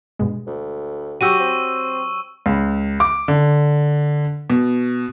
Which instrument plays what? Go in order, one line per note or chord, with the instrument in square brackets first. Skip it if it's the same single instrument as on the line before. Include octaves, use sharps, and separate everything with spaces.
[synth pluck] G2 B2 G#3
[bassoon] D2
[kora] F#3 F#4 G4 [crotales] C#6 E6 D#7
[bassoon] C4
[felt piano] C#2
D6
D3
B2